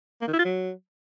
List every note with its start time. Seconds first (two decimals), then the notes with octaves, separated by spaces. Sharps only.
0.22 A#3
0.27 D#3
0.33 E4
0.39 F4
0.45 F#3